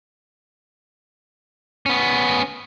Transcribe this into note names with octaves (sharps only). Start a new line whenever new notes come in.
B3 C#4